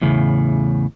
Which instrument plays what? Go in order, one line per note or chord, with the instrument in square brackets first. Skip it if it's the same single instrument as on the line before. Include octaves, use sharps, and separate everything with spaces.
[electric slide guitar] E2 A2 C#3